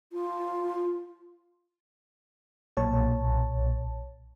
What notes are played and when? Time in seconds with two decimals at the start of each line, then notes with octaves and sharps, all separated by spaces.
0.13 F4
2.77 B1 A#2 C#5 A5